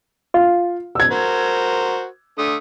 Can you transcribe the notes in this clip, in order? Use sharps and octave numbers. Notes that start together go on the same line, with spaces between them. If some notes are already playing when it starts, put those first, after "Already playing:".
F4
E6 G#6
F#4 A#4 C5
D3 A3 D#6